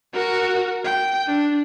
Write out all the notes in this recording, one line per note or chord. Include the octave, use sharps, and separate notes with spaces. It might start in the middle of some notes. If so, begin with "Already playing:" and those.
F#4 A#4
G5
D4